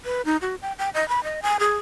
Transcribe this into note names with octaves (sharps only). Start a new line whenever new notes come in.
B4
D#4
F#4
G5
G5
D#5
B5
D#5
G#5
G#4